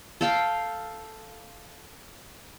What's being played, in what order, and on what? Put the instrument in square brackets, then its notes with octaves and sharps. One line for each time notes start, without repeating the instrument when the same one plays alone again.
[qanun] A4 F5 G5